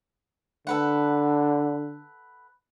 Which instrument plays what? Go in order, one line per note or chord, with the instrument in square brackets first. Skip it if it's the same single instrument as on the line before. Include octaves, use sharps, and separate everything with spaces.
[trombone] D3 [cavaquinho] A4 B4 F#5